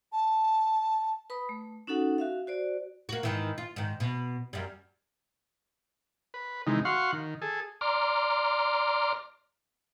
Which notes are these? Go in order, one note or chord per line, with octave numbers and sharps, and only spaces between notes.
A5
B4 B5 D#6
A3
C#4 D#4 F#4 A4 F#5
F#4 E5 F5
F#4 C5 D5
A#3 F#4
G#2 D#3 E3
F4
G#2 D#3
B2
F#2 G3
B4
C3 D#3 E3 G#3 D#4
F#4 F5 F#5 C6 C#6
D#3
G#4 A4
D5 A#5 C6 D6 F6